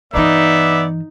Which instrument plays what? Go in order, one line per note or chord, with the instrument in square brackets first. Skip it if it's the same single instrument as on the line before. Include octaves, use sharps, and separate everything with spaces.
[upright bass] G2 E3 [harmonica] B3 D5 [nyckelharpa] D#4 [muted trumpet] E5